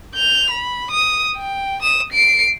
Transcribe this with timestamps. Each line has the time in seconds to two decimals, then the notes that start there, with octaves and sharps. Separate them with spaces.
0.15 G6 F7
0.50 B5
0.91 D#6
1.37 G5
1.82 D#6 E7
2.12 C7 D7